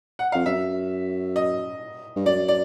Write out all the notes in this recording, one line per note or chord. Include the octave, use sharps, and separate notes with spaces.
F#5
F2 F5
F#2 E5
D#5
G2
F#2 D5
D5